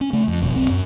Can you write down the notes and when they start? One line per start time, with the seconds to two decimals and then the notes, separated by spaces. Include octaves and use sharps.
0.01 C#4
0.13 C#3 A3
0.28 F2
0.42 F1 D#2 B2 F3
0.56 D#1 B1 C4
0.70 F#2